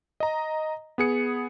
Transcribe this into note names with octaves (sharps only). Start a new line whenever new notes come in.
D#5 A#5
B3 G#4 C#7